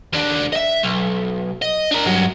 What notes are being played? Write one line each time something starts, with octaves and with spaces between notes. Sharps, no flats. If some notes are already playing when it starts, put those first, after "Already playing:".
D#2 D4
D#5 E5
B1
D#5
D4 A#4
G2 F#3